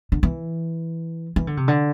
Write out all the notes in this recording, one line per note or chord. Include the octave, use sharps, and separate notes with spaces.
D3
E3
E3
D3
C3
D3